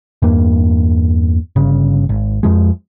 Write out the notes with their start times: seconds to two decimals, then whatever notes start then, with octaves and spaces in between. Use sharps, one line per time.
0.22 E2 G2 A#3
1.56 G1 C#3
2.09 G#1
2.43 F2 F3 G#3